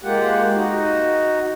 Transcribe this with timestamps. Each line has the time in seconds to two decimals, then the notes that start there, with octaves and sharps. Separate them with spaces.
0.03 G#3 A#3 F4 G4 F#5
0.54 D#4 F#4